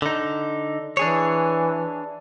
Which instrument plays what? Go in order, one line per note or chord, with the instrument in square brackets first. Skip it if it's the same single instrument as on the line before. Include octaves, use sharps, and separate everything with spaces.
[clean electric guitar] D3 D#4
[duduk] E3 [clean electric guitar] D4 G#4 C#5